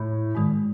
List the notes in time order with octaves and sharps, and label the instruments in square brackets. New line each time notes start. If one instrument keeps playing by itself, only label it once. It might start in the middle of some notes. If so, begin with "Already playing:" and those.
Already playing: [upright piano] A2
[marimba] G#2 D#3 G#3